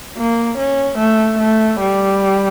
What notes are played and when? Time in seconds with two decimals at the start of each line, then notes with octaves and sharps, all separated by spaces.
0.17 A#3
0.58 C#4
0.99 A3
1.39 A3
1.79 G3